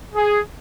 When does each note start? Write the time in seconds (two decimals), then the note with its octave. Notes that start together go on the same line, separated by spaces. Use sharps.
0.14 G#4